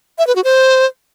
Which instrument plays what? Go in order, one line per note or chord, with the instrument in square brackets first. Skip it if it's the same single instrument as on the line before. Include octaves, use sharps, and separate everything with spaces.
[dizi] E5
B4
F#4
C5